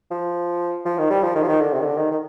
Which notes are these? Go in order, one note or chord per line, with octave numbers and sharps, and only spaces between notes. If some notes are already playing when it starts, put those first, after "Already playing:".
F3
F3
D#3
G3
F3
D#3
F3
D#3
D3
C3
D#3
D3
D#3
D#3